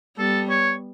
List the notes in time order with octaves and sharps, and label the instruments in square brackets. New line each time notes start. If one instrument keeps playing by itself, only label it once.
[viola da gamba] G3 B3 [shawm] A4
[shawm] C#5